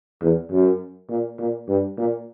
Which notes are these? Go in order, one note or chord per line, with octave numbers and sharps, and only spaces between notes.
E2
F#2
A#2
A#2
G2
A#2